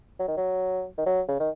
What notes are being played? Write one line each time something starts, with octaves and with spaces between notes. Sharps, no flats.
F#3
D#3
F#3
D#3
F#3
C#3
D#3